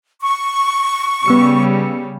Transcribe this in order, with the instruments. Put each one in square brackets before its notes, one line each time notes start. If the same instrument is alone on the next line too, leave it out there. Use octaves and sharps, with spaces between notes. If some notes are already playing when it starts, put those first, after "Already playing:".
[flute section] C#6
[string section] C#3 G3 [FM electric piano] B3 E6 C#7